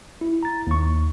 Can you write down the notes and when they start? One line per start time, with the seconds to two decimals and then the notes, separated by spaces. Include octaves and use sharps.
0.21 E4
0.43 A#5 A6
0.67 D#2 C#6